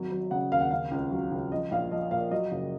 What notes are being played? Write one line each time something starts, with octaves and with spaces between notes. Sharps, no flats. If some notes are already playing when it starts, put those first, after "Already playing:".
Already playing: G#1 F#3
F#3
C#3 F#5
D#2 F5
F#5
C#3 F5
C#2
F#3
C#2
F3 D#5
A#1 F5
F3 D#5
A#2 F5
F#3 D#5
F#1